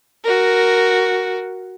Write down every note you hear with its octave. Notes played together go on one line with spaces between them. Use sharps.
F#4 A#4